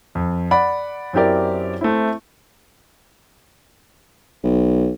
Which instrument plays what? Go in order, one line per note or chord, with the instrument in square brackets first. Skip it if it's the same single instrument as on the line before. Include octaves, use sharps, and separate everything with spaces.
[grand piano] F2
D5 F#5 B5
F#2 C4 E4 G4 A#4 D5
A3 C4 E4
[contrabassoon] B1